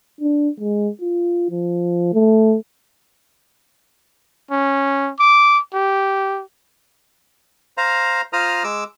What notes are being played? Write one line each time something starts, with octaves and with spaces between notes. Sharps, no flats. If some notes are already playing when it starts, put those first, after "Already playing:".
D4
G#3
F4
F3
A3
C#4
D6
G4
C5 F5 A#5
F4 C5 A#5 D#6 F6
G#3 D6 E6